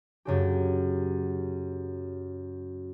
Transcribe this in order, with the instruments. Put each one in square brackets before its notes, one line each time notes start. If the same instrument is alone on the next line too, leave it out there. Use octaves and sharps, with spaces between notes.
[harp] F#2 C#3 G4